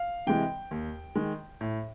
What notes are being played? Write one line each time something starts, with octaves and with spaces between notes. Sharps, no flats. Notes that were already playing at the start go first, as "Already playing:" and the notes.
Already playing: F5
C3 E3 G#3 G5
D#2
D#3 G#3
A2